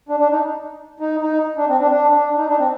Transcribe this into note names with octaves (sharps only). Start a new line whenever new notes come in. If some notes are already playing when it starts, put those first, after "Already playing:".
D4
D4
D#4
D#4
D#4
D4
C4
D4
D4
D4
D#4
D4
C4